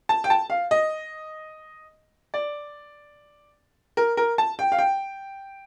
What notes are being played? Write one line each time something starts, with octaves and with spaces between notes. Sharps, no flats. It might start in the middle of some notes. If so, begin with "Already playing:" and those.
A5
G5
A5
F5
D#5
D5
A#4
A#4
A5
G5
F5
G5